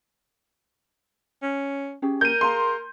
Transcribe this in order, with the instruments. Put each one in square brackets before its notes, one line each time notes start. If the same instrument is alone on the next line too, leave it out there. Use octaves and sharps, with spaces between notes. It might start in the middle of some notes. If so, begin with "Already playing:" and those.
[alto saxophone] C#4
[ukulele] C#4 G4 G#4
[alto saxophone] A#4 [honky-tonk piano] G6 D#7
[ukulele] G#4 F5 A#5 [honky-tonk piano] C6